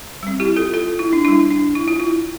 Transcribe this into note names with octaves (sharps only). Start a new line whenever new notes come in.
G3 C4
E4 G4
F4 A4
F4 A4
E4
D4
G3 D4 E4
D4
E4
F4
E4